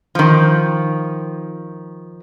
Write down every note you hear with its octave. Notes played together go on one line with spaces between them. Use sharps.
D#3 F3